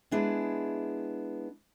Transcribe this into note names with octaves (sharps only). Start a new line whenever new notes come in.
G#3 B3 D4 E4 G#4